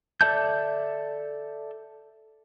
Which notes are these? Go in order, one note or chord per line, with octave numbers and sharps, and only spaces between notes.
A4 D5 E5 A5 G6